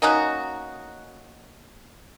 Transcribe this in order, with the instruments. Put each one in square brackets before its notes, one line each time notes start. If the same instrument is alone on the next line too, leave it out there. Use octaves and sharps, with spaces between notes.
[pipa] A#3 C#4 D#4 F#4